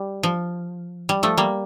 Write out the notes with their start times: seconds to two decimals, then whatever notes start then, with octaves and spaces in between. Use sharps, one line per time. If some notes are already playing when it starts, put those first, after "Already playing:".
Already playing: G3
0.23 F3
1.09 G3
1.23 F3 A3
1.38 G3 A#3